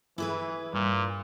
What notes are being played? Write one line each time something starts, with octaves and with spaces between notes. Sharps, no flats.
E3 E4 G#4 B4
G2 A#2